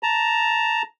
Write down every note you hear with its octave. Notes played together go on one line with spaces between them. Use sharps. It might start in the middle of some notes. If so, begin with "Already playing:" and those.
A5 A#5